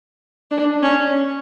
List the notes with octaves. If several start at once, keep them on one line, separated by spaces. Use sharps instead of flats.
D4
C#4